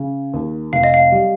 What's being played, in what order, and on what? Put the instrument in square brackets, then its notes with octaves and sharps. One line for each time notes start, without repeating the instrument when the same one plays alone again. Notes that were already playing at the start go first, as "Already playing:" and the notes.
Already playing: [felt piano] C#3
D#2
[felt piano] F1 [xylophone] F5
[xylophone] D#5
F5
[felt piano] G3